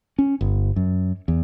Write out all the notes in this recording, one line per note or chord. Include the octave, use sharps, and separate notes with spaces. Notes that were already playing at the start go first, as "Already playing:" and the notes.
C#4
G1
F#2
E2